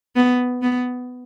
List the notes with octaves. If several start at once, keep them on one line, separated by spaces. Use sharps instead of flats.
B3
B3